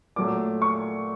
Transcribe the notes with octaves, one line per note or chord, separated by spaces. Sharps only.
A#2 F#3 A3 D6
C#6